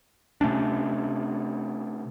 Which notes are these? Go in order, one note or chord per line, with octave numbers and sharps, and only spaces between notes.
C3 A3 C#4 D4